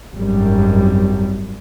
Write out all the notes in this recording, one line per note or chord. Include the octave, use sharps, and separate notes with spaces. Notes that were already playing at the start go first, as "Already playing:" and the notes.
G#1 F#2 G3